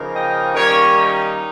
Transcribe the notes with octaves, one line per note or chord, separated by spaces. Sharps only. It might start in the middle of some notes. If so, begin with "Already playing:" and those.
Already playing: C#3 F3 A#3 D#4
D#5 G5
D#3 G3 A#3 C#4 A#4 C#5
D#4